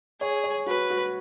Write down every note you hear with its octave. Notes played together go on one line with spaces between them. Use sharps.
G#4 C#5
C#5
F#4 B4
F#4